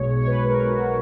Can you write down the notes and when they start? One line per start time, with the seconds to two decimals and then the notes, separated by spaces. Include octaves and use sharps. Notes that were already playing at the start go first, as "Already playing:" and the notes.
Already playing: B1 B2 G#3 C#5
0.18 C#5
0.27 B4
0.48 A#4
0.70 F#4